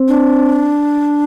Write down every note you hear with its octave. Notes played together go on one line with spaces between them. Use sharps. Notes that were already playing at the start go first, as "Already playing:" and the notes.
Already playing: C4
D4